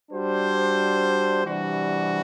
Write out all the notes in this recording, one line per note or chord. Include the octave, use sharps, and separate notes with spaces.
G3 D4 F#4 C5
C3 E3 G3 D4 F#4